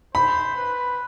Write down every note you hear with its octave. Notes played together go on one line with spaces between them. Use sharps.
C5 B5
B4